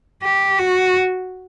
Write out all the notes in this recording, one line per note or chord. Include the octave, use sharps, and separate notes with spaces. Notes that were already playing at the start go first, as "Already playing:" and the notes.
G4
F#4